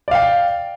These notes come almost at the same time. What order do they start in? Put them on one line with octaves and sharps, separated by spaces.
D5 F5 G5